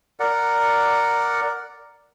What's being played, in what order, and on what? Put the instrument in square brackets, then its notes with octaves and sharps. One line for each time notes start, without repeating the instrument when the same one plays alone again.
[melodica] A#4 D5 F#5